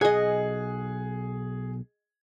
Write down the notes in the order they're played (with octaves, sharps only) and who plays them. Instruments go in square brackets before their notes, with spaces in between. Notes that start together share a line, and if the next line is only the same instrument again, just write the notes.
[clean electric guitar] B1 B2 F#5 [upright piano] G#4 [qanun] D#5 G#5